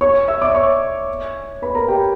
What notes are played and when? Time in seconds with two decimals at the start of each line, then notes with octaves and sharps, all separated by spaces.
0.01 C#5 C#6
0.28 E5 E6
0.42 D5 D6
0.55 C#5 C#6
1.62 B4 B5
1.75 A#4 A#5
1.88 G4 G5